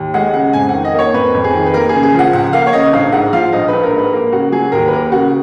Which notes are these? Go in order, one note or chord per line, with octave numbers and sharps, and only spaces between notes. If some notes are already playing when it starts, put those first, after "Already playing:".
Already playing: D#2
G#3 F#5
C#3 F#5
F2 G#5
F#5
D#3
D#5
A#3 C#5
F2 B4
F2
G#4
D#3
B4
A#3 A#4
C#3 G#4
G#4
F3 F#5
C#2 F#5
A#3 F5
C#5
C#3 D#5
A#1 F5
G#2 F#5
F3 F5
A#1 D#5
B4
A#1
A#4
G#2
B4
A#3 A#4
C#3 F#4
F#3 G#4
D#2 A#4
B4
A#3 A#4
C#3 F#4